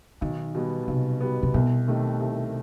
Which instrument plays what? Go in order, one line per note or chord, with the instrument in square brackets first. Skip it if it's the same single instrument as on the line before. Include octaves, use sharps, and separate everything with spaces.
[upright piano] B1 [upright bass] D#3
[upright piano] B2 G3 B3
[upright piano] B1 [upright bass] C3
[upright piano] B2 G3 B3
[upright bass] C3
[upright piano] C2 [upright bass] B2
[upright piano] C3 D#3 A3
C2